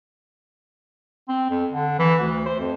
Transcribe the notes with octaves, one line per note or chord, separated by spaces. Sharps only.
C4
F2
D3
E3
D2
C5
F2